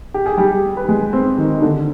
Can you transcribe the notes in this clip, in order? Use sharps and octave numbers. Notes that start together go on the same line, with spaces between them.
G4
G#4
G3 G4
B4
G#3 G#4
C4 C5
D#3 D#4
D#4
D3 D4